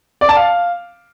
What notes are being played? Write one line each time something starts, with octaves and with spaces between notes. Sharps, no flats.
D5
A5
F5